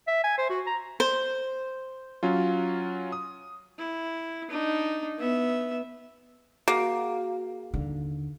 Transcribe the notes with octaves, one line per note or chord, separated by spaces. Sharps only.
E5
G#5
C5
F#4
A#5
C5
F#3 C#4 F4
D#6
E4
D4 D#4
B3 E5
A#3 F#4 G#4
D#2 D3